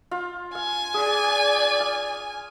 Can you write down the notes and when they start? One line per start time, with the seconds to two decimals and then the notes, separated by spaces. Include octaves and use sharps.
0.11 F4
0.55 F5 G#5
0.94 G#4 D5
1.80 F5